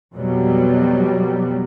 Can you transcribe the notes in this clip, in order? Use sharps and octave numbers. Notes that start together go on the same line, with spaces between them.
F2 B2 F#3 G3